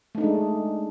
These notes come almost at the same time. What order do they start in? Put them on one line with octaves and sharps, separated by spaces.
A3 D#4 D4 G#3